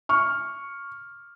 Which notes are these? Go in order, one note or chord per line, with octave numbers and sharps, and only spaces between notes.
C#6 F6